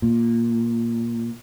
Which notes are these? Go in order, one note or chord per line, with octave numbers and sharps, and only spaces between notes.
A#2